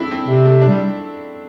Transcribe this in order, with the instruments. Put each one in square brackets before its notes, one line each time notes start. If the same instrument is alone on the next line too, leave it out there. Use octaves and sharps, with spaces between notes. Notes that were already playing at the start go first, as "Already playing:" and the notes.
Already playing: [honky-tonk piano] A3 C4 D4 E4
C4
[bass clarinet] C3
[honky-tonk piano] A3
D4
[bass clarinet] G3